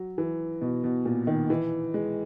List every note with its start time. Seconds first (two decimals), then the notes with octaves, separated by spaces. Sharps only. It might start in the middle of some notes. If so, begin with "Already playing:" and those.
Already playing: F#3
0.18 E3
0.62 B2
0.84 B2
1.05 A#2
1.27 D#3
1.50 E3
1.94 G#3